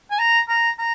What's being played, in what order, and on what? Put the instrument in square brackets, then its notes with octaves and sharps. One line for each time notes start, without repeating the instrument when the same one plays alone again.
[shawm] G#5
A#5
A#5
A#5